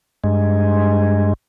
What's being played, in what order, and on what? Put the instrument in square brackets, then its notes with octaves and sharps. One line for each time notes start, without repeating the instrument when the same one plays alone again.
[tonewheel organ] G2 G#3